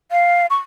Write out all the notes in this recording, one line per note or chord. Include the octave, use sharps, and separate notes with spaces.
F5
C#6